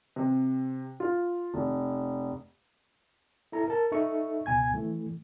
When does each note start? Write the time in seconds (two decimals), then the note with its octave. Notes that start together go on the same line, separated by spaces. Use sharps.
0.16 C3
1.00 F4
1.54 F1
3.52 E4 A4 A#5
3.68 A#4 A5
3.92 D#4 A4 E5 C#6
4.46 C#2 B2 G#5 G#6
4.74 E3 A3